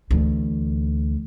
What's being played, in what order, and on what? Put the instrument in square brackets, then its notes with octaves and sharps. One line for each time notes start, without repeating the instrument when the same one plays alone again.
[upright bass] D2 E3